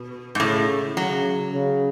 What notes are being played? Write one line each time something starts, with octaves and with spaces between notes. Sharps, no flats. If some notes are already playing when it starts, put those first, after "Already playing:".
Already playing: B2
G#2
A2 C#3
C#3 F#3
C#3